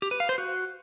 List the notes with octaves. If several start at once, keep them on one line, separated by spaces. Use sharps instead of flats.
G4
B4
F5
C5
F#4